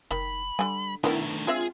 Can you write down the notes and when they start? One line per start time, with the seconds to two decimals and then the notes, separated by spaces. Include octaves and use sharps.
0.11 F#1 D#3 B5
0.59 D3 G3 G#5
1.04 D#3 A3 B3 D4 E4 A#4 G5
1.47 G#3 C4 F4 G#4 E5